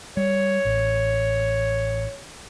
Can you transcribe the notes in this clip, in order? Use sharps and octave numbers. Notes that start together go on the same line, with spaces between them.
G3 C#5
A1